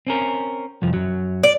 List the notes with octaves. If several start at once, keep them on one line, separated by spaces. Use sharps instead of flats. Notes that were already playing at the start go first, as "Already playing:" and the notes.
C4 C#4 A#4
C2 F2 F3
F#2 F#3
D5